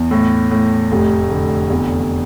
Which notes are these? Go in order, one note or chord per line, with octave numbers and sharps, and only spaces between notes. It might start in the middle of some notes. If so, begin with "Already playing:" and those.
Already playing: E2
A2
A2
F1
D3
E2